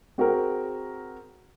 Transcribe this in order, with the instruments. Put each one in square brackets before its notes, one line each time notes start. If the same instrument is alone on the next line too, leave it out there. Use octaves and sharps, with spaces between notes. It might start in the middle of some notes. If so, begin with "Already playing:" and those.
[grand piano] C4 F#4 G#4 A#4